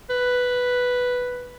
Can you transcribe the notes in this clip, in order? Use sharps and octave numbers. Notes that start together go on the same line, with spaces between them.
B4